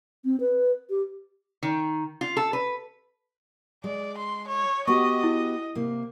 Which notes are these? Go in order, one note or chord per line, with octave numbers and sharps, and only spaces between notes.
C4
B4
G4
D#3
F4
A4
B4
G#3 D5
C6
C#5
B3 F#4 G4 D#5 C#6
E4
C3 A#3